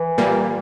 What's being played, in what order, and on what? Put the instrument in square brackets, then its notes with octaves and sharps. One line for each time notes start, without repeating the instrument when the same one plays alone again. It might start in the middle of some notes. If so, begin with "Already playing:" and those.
Already playing: [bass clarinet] E3
[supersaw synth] A#2 G3 A#3